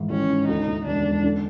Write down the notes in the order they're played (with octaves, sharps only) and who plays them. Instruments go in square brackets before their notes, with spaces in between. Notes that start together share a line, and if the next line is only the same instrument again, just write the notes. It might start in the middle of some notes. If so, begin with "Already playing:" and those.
Already playing: [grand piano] G#2 D#3 E3
[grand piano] A1 [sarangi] C#4
[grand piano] G#2
[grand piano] D2 [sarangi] D#4
[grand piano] D2
[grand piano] E1 [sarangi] D4
[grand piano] E1
D3